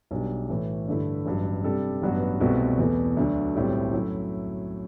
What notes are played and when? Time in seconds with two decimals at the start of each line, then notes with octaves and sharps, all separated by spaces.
0.11 B1 B2 G3 D4
0.49 A2 E3 A3
0.88 G2 D3 A3 E4
1.26 A1 G2 F#3
1.64 C3 G3 D4 A4 D5
2.02 A1 G2 F#3 B3 F#4
2.41 C2 B2 A3 C4 F#4
2.79 E2 B2 A3
3.17 D2 D3 F#3 A3 D4
3.55 B1 A2 G3 C4
3.93 F#2 F#3 A3 E4